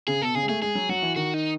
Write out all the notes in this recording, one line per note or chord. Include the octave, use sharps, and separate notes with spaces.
C#3 G#4
B2 A4
C#3 G#4
G#3
A3 G#4
G#3 G#4
F#3
F#3 F#4
E3
D#3 F#4
D#4